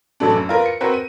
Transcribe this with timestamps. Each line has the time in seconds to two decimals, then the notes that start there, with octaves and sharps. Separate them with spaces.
0.20 A1 F#3 A3 D4
0.33 F#2
0.49 F4 A#4 B4
0.66 C#7
0.81 C4 F#4 A#4 B4
0.94 D#7